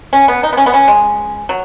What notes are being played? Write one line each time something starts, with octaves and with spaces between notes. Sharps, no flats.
C#4
B3
D#4
B3
C#4
B3
C#4
G#3
F#3